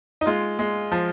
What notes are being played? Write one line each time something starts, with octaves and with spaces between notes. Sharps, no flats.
D#4
G#3 F4
G#3
F3